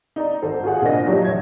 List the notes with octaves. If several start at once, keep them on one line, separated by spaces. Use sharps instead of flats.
D#4 D5 A#5
G#1 A4 C5
F4 F#4 G#4 F#5
A#2 D#3 D4 C5 D#5 A#6
F3 F#3 D#4 G4 C#5
A#1 C#5 E5 G#6